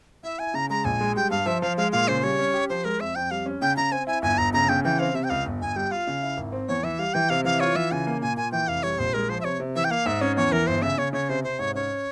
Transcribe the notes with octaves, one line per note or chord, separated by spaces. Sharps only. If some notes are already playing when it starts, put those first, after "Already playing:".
E4 E5
E4 G#5
C#3 A#5
G#3 A#5
A#1 G#5
G#3
G3 G5
G2 F5
F3 E5
F3 F5
G#3 F5
A#2 F5
C#3 C5
G3 C#5
C#4
G4
F3 C5
G#3 A#4
F2 E5
F2 G5
G3 F5
C#4
C#3 G5
C#3 A#5
C4 G#5
E4 G#5
G1 G#5
G1 A#5
C#3 A#5
C#3 G5
E3 G5
C4 F5
C3 E5
G5
C#2 F5
G1
G1 G#5
G3 G5
F4 F5
C#3
E4
G#1
C4
E2 C#5
E3 E5
G3 F5
E3 G5
C3 F5
E3 F5
F4 C#5
E3 E5
C#3 G#5
A#3
A#2 G#5
A#2 G#5
E3 G5
F1 F5
G3 C#5
A#1 C5
G#3 A#4
F3 C5
E5
C3 C#5
C3
E3 E5
G5
A#3 F5
G#2 E5
C#4 C#5
E2 C#5
E3 A#4
G1 C5
C#3 E5
C#3 C#5
C#3 C#5
C3 C5
C3 C5
G#2 C#5
C#4 C#5